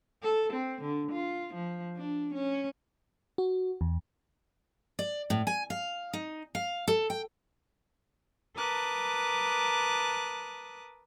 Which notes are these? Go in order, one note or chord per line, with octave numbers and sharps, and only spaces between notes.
A4
C4
D3
F4
F3
D4
C#4
F#4
E2
D5
A2
G#5
F5
D#4
F5
A4
G5
A#4 B4 A5 D6 D#6 F#6